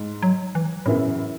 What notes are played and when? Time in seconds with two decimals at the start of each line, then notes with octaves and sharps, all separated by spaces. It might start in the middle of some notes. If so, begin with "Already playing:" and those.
Already playing: G#2
0.22 F#3
0.55 E3
0.86 F#2 A2 C#3 E3 B3 E4